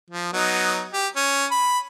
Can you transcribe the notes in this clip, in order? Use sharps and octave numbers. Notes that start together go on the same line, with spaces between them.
F3
F#3 B3 D#4
G4
C#4
B5